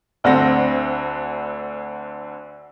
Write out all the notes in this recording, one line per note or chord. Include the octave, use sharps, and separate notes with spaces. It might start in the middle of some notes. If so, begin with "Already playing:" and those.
D2 D3 C4 D4 F#5 A#6